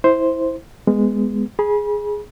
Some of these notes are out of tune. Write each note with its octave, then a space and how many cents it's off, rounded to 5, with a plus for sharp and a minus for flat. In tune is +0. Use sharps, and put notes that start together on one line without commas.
E4 -10 C5 +0
G#3 -10 B3 +0
G#4 +0 B5 -35